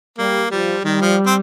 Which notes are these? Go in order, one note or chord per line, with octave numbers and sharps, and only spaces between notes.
G3 A#3
F3 G3
D#3 G3
F3
C4